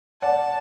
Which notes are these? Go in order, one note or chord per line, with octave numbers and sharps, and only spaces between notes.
D5 F#5 A5